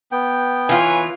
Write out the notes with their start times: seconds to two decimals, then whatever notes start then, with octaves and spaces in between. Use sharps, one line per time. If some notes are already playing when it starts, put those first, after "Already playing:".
0.12 B3 G5
0.69 E3 F4 B4 C#5 G#5